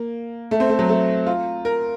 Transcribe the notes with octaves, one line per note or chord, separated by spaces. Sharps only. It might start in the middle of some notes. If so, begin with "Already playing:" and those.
Already playing: A#3
A3
C4
A3
F#3
A3
F4
A#4